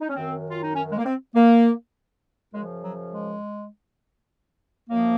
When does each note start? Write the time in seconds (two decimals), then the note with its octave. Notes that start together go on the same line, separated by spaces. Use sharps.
0.01 D#4
0.09 C#4
0.16 F#2 D#3 C4
0.50 F4
0.62 D#4
0.75 C#4
0.91 G#3
0.98 A#3
1.05 C4
1.34 A#3
2.53 F#2 C#3 F3 G#3
2.83 F#3
3.13 G#3
4.90 F#2 F3 A#3